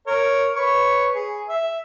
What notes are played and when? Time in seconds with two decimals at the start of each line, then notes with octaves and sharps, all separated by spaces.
0.07 A#4 C#5
0.55 B4 C#5 C#6
1.14 G#4
1.48 E5